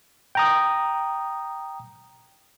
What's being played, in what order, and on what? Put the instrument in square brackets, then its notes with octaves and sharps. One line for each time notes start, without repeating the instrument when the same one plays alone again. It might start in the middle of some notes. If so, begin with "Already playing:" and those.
[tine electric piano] G5 A#5 D#6